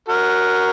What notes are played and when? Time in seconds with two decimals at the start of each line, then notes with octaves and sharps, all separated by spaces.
0.08 F#4 A#4